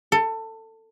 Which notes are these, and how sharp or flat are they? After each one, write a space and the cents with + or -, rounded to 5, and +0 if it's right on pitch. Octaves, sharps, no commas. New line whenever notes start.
A4 +20